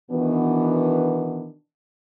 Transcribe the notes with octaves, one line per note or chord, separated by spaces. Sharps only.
B2 D#3 E3 B3 D4 F#4